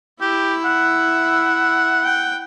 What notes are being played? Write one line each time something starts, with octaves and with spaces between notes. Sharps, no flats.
E4 G4 E5
F#5
G5